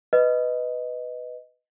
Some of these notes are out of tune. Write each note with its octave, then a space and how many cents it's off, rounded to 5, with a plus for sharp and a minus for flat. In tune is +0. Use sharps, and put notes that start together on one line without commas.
B4 +5 D#5 +0